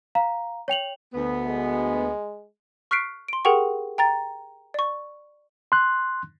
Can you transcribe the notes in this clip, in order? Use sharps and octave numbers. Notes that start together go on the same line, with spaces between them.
F5 A#5
C#5 G5 F7 F#7
D2 B3
G#3
C#6 F6 F#6 B6 C7 D7
C6 D7
G4 G#4 A#4 F#5 G5 C#6
G5 A#5 A6
D5 C#6
C6 F#6